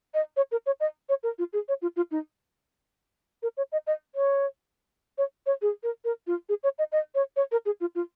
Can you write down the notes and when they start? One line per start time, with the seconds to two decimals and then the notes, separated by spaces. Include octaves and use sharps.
0.14 D#5
0.37 C#5
0.52 A#4
0.66 C#5
0.80 D#5
1.09 C#5
1.23 A#4
1.39 F4
1.53 G#4
1.68 C#5
1.82 F4
1.96 F4
2.11 D#4
3.43 A#4
3.57 C#5
3.72 D#5
3.87 D#5
4.15 C#5
5.18 C#5
5.46 C#5
5.62 G#4
5.83 A#4
6.05 A#4
6.27 F4
6.49 G#4
6.64 C#5
6.78 D#5
6.92 D#5
7.15 C#5
7.36 C#5
7.52 A#4
7.66 G#4
7.80 F4
7.95 F4